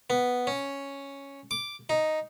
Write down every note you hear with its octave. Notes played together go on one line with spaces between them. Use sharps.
B3
C#4
D6
D#4